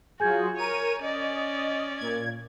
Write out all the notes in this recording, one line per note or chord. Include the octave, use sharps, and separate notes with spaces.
F#3 F4 F#4 G#4 G#5 G6 G#6
A#4 C#5 D#7
C#4 D5 D#5
A#2 G#6